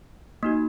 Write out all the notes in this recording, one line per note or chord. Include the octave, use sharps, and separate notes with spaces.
A#3 D#4 F#4